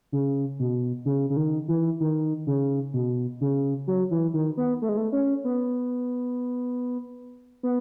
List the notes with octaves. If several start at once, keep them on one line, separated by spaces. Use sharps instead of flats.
C#3
B2
C#3
C#3
D#3
E3
D#3
C#3
B2
C#3
F#3
E3
D#3
B3
A3
G#3
A3
C#4
B3
B3